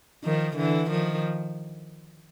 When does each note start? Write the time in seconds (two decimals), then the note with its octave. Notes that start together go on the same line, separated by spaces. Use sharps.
0.24 D#3 F3
0.56 D3 E3
0.90 D#3 F3